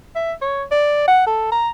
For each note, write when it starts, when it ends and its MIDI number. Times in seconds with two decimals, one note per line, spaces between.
0.16 0.32 76
0.41 0.64 73
0.71 1.06 74
1.08 1.25 78
1.27 1.47 69
1.52 1.69 82